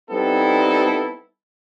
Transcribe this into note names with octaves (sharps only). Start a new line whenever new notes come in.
G3 B3 C4 D#4 E4 A4